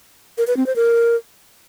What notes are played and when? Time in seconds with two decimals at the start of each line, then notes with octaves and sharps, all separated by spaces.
0.38 A#4
0.47 B4
0.57 C4
0.66 C5
0.76 A#4